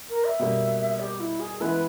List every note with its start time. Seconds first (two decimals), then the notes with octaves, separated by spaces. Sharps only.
0.09 A#4
0.24 E5
0.39 B2 G3 A#3
1.00 G4
1.20 E4
1.40 G#4
1.60 E3 G#3 B3 E4 B4